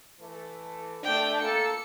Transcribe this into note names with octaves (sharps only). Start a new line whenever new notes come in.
E3 A3 A4
A3 D4 G5
A#3 F4 A4 C#7